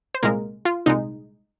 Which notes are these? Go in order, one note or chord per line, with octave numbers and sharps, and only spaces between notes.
C5
C2 A#2 G#3 A#3 A#4
F4
C2 A#2 G#3 D#4